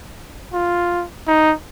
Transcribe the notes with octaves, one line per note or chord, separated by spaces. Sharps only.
F4
D#4